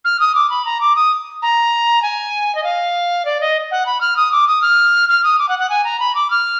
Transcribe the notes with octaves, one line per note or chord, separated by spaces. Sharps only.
F6
D#6
D6
B5
A#5
D6
D#6
A#5
G#5
D#5
F5
D5
D#5
F#5
B5
F6
D#6
D6
D#6
F6
F6
D#6
D6
F#5
F#5
G#5
A#5
B5
D6
F6